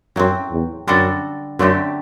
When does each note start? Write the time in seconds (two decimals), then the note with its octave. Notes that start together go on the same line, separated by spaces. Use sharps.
0.16 F#2 A2 F#3 C4
0.51 E2
0.87 F#2 D3 G3 D4 F#4 A4
1.59 F#2 D3 F#3 A3 C4 G4